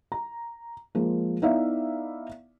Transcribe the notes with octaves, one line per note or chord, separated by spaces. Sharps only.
A#5
F3 G#3 A#3
B3 D#4 E4 D5 E5 F5